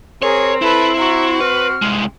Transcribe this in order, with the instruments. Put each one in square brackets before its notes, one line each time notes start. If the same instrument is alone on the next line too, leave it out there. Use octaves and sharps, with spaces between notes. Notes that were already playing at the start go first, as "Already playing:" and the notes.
[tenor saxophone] C4 [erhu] G#4 [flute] A#4 [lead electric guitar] C#5
[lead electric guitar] E4 [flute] A4 [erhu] B4
[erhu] F#4 [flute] A#5
[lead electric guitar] B4 [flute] F6
[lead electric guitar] C2 G#3